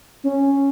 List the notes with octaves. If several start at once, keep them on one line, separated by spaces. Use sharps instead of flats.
C#4